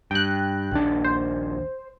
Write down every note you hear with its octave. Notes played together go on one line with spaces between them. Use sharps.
G2 G5 F#6
A#1 D#2 D4
C5